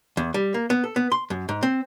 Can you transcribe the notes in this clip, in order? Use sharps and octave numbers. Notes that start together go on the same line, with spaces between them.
E2
G3
A#3
B3
A4
B3
C6
F#2
G#2
C4